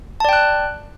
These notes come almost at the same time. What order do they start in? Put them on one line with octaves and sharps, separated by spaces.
A5 D5 G5 F#6